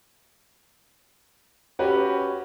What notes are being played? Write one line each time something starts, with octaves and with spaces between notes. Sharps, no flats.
C#4 F#4 G4 B4